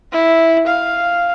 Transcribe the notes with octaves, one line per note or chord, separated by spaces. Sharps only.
E4
F5